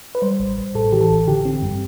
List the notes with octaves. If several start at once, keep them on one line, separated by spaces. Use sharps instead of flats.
B4
G3 C5
A1
A1
A2 A4
E3 G4
A4
A1
D3 G4
C4
G2